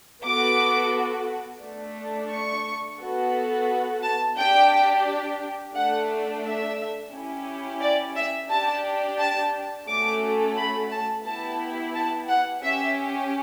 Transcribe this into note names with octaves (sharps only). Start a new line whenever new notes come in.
B3 F#4 A4 D6
A3 D4 A4
C#6
B3 F#4 A4
A5
D4 G4 G5
A3 D4 A4 F#5
E5
C#4 E4 G4
D5
E5
D4 G4 A5
A5
A3 C#4 F#4 A4 D6
B5
A5
B3 E4 G4 A5
A5
F#5
C#4 G4 E5